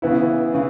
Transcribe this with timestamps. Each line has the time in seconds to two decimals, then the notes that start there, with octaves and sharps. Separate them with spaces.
0.02 C#3 E3 B3 E4
0.54 C#3 E3